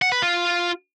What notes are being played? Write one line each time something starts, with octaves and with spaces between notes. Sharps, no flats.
F#5
B4
F4